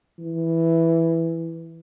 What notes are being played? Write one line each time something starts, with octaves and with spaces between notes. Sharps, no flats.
E3